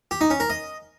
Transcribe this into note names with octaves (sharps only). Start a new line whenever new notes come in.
G4
D#4
C#4
A#4
D#5